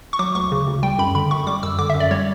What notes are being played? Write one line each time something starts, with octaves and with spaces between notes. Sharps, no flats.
C#6
F#3 D6
D2 C#6
C#3
D2
G3 G5
F#2 B5
D3 B5
F#2 C#6
G3 D6
F#2 E6
D3 D6
E5
F#2
D5
G3 C#5